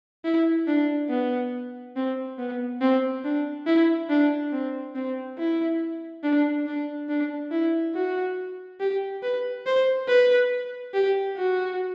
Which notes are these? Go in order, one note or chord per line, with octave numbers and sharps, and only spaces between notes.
E4
D4
B3
C4
B3
C4
D4
E4
D4
C4
C4
E4
D4
D4
D4
E4
F#4
G4
B4
C5
B4
G4
F#4